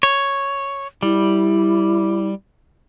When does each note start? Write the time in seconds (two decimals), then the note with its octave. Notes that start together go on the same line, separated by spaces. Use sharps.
0.03 C#5
1.03 G3 E4